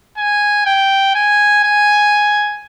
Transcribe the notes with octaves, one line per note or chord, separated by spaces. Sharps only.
G#5
G5
G#5
G#5